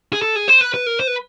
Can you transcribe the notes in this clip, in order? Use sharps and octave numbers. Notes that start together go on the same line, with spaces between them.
G#4
A4
G#4
C5
B4
B4
A#4
C5
B4